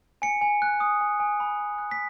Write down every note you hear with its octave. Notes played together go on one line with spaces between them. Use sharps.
G#5 C#7
G#5
F#6
D#6
G#5
G#5
B5
B5
F#6
B6